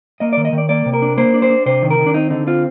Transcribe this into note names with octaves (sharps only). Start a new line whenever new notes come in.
A#3 D#5
D#3 D5
D#5
D#3
D5
A#3 D5
C3
A#4
D4
A#3 C5
D4
C5
D4
C3 C5
D#3
A#4
D#3
D4
C4 D#4
D3 D#4
C4 F4